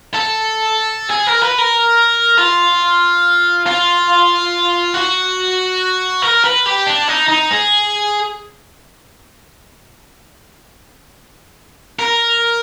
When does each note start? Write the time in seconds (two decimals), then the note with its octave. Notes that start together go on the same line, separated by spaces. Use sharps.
0.14 A4
1.10 G#4
1.27 A#4
1.42 B4
1.59 A#4
2.38 F4
3.66 F4
4.94 F#4
6.22 A#4
6.44 B4
6.66 G4
6.87 D4
7.09 D#4
7.29 D#4
7.51 G#4
11.99 A#4